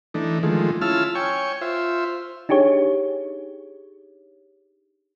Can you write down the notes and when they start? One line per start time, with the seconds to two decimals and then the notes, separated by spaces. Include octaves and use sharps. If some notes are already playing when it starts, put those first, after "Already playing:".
0.14 E3 A3 D4 D#4
0.43 D#3 F3 G#3 A3
0.81 C#4 E4 F4 A5 E6 F6
1.15 C#5 G5 G#5 C#6
1.61 F4 C5 E5
2.49 D4 D#4 G4 G#4 C#5